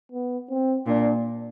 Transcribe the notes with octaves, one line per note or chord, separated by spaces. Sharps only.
B3
C4
A#2 D4